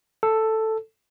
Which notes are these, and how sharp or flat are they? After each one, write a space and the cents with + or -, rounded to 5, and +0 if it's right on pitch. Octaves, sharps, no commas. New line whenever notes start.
A4 +5